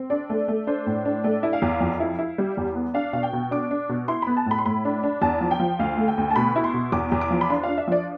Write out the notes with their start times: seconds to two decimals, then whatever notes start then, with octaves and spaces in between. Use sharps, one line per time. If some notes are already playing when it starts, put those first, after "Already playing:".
Already playing: C4
0.10 D4 D5
0.30 A3
0.48 A3
0.67 D4 C5
0.86 A2
1.05 D4
1.24 A3 D5
1.43 E4
1.53 F5
1.62 E2
1.81 F2
2.00 E4
2.19 E4
2.38 G3
2.57 E2
2.75 B3
2.94 D4 F5
3.13 B2 F5
3.23 G5
3.33 B2
3.51 D4 D6
3.71 D4
3.89 B2
4.08 E4 C6
4.22 B3 B5
4.37 A5
4.46 A2 B5
4.58 C6
4.66 A2 B5
4.85 D4
5.03 D4
5.22 E2 A5
5.41 F3
5.51 G5
5.60 F3
5.79 D2 F5
5.97 A3
6.08 G5
6.18 D2
6.30 A5
6.36 B2 B5
6.56 E4
6.64 C6
6.74 B2
6.92 E2 D6
7.12 E2
7.21 D6
7.30 F3
7.41 B5
7.50 D4 C6
7.63 D4 F5
7.78 E5
7.88 F3 D5